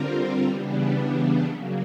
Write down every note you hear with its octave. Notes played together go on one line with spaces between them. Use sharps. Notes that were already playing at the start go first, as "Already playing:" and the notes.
Already playing: D3 G3 C4 F4 A#4
C#3 E3 G3 B3 D4
C#3 F#3 A#3